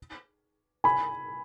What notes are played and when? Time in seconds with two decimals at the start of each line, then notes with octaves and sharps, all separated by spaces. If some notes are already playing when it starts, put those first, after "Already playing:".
0.84 G#5 B5